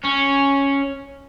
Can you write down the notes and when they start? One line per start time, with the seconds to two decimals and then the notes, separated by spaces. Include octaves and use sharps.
0.04 C#4